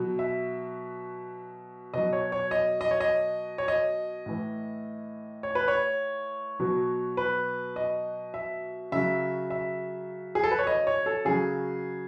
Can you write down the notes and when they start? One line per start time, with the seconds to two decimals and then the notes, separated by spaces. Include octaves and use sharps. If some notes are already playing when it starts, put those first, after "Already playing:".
Already playing: B2 F#3
0.19 E5
1.94 B2 F#3 D#5
2.13 C#5
2.32 C#5
2.51 D#5
2.81 D#5
2.91 C#5
3.00 D#5
3.58 C#5
3.68 D#5
4.26 A2 E3
5.43 C#5
5.55 B4
5.68 C#5
6.59 B2 F#3
7.17 B4
7.76 D#5
8.34 E5
8.92 C#3 F#3 E5
9.50 E5
10.35 G#4
10.43 A4
10.51 B4
10.59 C#5
10.67 D#5
10.87 C#5
11.06 A4
11.25 C#3 F#3 G#4